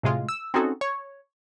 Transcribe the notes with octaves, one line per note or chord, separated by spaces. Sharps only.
A2 C3 G#3 F4
E6
C4 C#4 D#4 F#4 G#4 A4
C#5